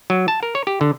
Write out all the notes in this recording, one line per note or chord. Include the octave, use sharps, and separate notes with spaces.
F#3
A5
A#4
C#5
G4
D3